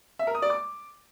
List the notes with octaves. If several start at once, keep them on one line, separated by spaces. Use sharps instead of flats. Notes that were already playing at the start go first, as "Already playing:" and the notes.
E5
A#4
D#6
D5
D6